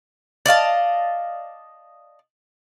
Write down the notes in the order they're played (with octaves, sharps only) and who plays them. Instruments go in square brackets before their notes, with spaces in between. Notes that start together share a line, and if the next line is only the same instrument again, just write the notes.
[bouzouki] D5 D#5 F5 A5